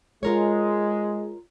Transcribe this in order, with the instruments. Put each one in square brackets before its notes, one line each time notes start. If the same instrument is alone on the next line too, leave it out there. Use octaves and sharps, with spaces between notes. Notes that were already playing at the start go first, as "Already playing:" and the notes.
[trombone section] G#3 [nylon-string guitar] F4 A#4 C#5